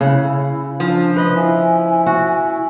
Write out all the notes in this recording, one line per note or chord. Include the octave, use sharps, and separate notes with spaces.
C#3 E4 F#5
F3 D4
B4 D#5
E4 G#5
F#4